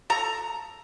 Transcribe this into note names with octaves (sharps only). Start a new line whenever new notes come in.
A4 A#5